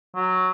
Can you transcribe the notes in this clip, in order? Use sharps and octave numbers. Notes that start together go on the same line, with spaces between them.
F#3